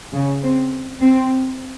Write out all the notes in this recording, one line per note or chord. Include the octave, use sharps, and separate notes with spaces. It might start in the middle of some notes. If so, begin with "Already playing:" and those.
C#3
C4
C4